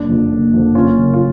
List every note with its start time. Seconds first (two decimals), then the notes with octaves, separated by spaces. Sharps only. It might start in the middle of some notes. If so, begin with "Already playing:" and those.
Already playing: F#1 D4
0.09 F2 D3 F3
0.32 F#1
0.54 F2 D3 F3
0.75 F#1 C#4 F4
0.98 F#2 C#3 F#3
1.14 F4